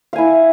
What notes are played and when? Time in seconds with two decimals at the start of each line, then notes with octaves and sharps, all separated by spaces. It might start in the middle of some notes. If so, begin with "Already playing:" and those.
0.13 F5
0.16 G#5
0.18 E4